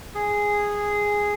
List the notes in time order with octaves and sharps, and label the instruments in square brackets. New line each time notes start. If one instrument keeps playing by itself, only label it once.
[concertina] G#4